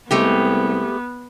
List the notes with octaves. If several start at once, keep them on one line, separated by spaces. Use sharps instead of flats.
C2 G#3 A3 B3 G4